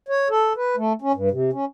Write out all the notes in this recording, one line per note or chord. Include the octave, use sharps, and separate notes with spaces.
C#5
A4
B4
A3
C#4
G2
C3
C#4